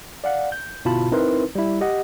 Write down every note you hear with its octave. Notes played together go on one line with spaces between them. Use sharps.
D5 F5 F#5
G6
G1 B2 E4 F4 A5 B5
C4 D#4 E4 A#4 B4 C6
G3 E4
G4 D#5 F#5